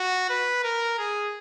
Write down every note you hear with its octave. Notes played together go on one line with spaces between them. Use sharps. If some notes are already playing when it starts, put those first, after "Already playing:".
Already playing: F#4
B4
A#4
G#4